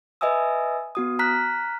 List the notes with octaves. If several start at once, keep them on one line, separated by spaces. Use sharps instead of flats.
B4 D#5 E5 G#5 D#6 E6
B3 F#4 D#6
A#5 F6 F#6 B6